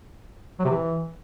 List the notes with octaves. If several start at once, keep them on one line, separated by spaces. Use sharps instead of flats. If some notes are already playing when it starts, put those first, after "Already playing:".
F#3
C3
E3